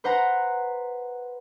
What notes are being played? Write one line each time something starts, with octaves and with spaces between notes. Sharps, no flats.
B4 C5 F#5 A#5